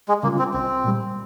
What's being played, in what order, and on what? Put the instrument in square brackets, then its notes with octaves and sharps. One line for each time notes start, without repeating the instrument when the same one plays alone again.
[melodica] G#3
[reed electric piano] C#3 G3 C#4 F4 [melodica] A#3
[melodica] C4
[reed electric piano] C2 [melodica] C4
[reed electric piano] A#2 G3